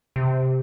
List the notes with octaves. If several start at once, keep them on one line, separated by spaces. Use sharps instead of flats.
C3